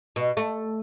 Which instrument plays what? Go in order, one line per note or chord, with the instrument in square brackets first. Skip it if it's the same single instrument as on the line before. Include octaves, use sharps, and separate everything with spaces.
[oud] B2
A3